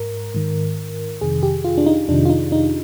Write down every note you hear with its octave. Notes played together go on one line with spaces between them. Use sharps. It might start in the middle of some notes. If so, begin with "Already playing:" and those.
Already playing: G#2 A#4
G#2 D#3
F2 C3 D#3 G#4
G4
F4
D4
D#4
F2 C3 D#3 D4
F4
D#4
D#4